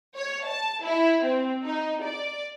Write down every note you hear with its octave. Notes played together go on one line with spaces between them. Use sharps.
C#5
A5
E4
C4
D#4
D5